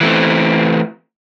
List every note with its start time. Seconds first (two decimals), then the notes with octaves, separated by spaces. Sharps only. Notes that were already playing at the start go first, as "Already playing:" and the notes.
0.01 E3 A3 C4